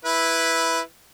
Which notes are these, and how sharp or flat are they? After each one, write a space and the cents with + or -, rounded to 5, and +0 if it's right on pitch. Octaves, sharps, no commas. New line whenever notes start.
E4 +0 B4 +0